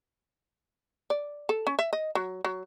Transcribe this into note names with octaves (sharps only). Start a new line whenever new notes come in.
D5
A4
C#4
E5
D#5
F#3
F#3